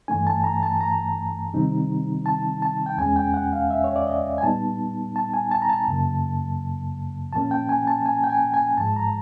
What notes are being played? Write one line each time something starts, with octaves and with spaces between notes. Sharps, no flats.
G2 E3 A3 D4 G#5
A5
A#5
A5
A#5
C3 D#3 G3 C4 D#4
A5
A5
G5
E2 B2 G#3 C#4 G#5
G5
F#5
F5
E5
C#5
D5
D#5
G#5
A#2 G3 B3 D#4 A5
A5
G#5
A5
A#5
A5
F#2 C#3 F#3 A#3
A#2 F3 A#3 C#4 A5
G5
G#5
A5
G#5
G5
G#5
G#5
G#2 F3 G#3 A5
A#5